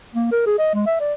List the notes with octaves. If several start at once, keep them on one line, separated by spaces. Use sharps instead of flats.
A#3
A#4
G#4
D#5
G#3
E5
D5